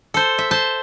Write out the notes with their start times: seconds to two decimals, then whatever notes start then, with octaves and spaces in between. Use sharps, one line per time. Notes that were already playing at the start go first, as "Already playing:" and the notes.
0.14 A4 C5
0.38 E5
0.51 C5 A5